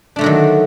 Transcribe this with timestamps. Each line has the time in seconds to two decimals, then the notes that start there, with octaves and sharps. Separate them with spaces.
0.16 D4
0.19 A3
0.21 D3
0.24 F#3
0.26 D#3